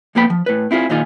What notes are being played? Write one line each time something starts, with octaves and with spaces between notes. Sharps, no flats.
F2 A#2 A#3 B3 G5 B5
F3
A2 B4
C4 E4 F4 G#4
A#2 D#3 D#4 F4 G#4